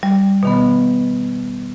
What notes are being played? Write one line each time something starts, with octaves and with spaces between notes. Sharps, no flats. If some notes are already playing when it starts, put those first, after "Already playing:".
G3
B2 D#3 B3